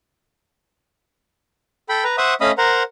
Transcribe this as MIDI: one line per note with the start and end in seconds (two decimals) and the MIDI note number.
1.89 2.04 69
1.89 2.04 79
1.89 2.04 83
2.04 2.16 71
2.04 2.16 82
2.18 2.34 72
2.18 2.34 76
2.18 2.34 78
2.18 2.34 85
2.18 2.34 87
2.41 2.51 57
2.41 2.51 61
2.41 2.51 75
2.41 2.51 77
2.41 2.51 83
2.41 2.51 87
2.58 2.83 70
2.58 2.83 72
2.58 2.83 78
2.58 2.83 82